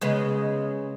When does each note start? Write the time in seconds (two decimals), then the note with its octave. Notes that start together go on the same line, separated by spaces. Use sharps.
0.01 C#3 G#3 B3